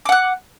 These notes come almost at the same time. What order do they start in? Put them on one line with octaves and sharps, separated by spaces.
D6 F#5 F#6